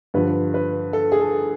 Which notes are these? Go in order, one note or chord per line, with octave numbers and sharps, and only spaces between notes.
G2 D3 F3 B4
B4
A4
G#4
A4